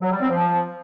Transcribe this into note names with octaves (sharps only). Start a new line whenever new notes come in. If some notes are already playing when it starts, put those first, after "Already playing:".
F#3
G3
C4
F3